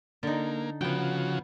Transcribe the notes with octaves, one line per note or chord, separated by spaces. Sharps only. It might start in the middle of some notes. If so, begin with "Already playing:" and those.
D3 A#3 D#4
C#3 F3 B3 F#4 G5